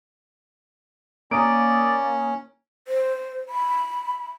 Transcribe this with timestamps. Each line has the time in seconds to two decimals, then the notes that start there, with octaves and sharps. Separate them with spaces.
1.31 A#3 C#4 D5 A#5 D#6 D7
2.88 C5
3.49 B5